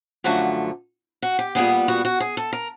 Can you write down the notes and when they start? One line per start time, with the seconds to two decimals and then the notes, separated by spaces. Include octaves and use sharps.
0.24 F#2 D3 F3 A3 F#4
1.22 F#4
1.39 G4
1.55 A#2 G3 B3 G#4
1.88 F#4
2.05 F#4
2.20 G#4
2.37 A4
2.53 A#4